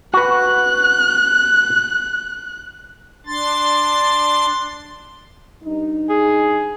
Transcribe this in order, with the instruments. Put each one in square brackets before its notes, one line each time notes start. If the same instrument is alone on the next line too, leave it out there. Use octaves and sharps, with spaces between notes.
[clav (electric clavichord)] F#4 B4 [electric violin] F#6
[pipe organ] D4 C6 A6
[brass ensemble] G2 D#4
[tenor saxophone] G#4